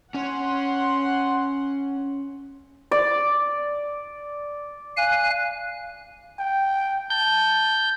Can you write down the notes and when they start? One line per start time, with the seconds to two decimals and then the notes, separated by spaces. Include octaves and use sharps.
0.14 C#4 C#5 F#5 C6
2.91 D5
4.97 F5 G#5 F#6
6.39 G5
7.10 A5 G6